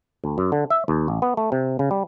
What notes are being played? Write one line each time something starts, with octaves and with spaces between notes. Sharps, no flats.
D2
F#2
D3
E5
D#2
A1
B3
A3
C3
C#3
G3